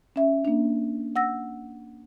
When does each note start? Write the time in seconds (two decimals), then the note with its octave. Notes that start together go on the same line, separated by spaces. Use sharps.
0.16 C#4 E5
0.45 A#3 D4
1.16 F#5 E6 A#6